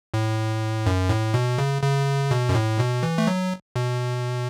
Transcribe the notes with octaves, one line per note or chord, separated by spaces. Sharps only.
A2
F#2
A2
B2
C#3
C#3
B2
F#2
A2
B2
E3
A3
F#3
B2